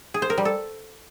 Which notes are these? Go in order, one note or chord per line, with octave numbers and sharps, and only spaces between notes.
G#4
C5
A#4
G3
A4